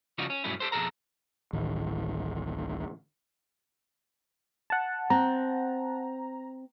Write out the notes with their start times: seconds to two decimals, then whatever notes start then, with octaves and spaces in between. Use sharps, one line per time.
0.18 C#3 F3 G3 D#4 F4 F#4
0.30 C#4
0.44 G2 B2 F#3 A3 C#4 E4
0.60 G4 A4 C5
0.72 F2 B2 D#3 G#4 A4 A#5
1.53 D1 A1 D#3
4.70 F#5 A5
5.10 C4 A#5